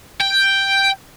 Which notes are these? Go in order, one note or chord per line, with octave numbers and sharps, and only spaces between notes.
G5